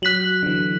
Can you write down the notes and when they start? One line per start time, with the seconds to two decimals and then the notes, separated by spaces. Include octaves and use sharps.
0.02 F#3 F#6 B6 F#7
0.43 D3
0.47 E3